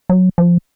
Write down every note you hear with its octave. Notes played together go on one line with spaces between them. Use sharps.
F#3
F3